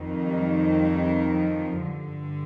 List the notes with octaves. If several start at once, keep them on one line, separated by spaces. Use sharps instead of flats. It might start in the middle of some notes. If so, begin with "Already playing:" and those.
Already playing: F2 D#3
G3
G3
F3
G2 D3